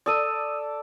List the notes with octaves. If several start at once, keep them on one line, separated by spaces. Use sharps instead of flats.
A4 D5 D#6 E6 D#7